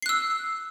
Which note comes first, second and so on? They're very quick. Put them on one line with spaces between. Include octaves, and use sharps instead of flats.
C7 F#6 E6